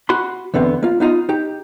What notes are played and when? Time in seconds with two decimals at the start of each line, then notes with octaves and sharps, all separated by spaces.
0.09 F#4 B5 C6
0.54 E2 D3 B3 C4
0.83 A#3 F4
1.00 B3 D#4 F4 D#5
1.29 D#4 G4